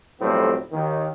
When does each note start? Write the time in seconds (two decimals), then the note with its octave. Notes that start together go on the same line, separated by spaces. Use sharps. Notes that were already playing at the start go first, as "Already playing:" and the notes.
0.20 B1 F2 A2 G3 C4
0.72 D#2 D#3